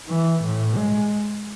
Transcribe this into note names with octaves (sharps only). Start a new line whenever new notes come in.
E3
A2
G#3